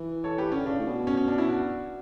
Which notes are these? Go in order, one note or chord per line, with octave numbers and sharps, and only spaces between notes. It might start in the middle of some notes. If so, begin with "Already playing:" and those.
Already playing: E3
A4 C#5
G4 B4
D3 C#4
C#3 D4
A2
B2
C#4
C#4
D4
C#4 E4
D4 F#4